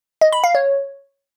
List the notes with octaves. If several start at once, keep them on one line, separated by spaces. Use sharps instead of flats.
D#5
B5
F5
C#5